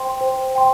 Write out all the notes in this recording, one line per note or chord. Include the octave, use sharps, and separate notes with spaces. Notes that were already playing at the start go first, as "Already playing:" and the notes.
Already playing: C5 G5 C6
C5
G5 C6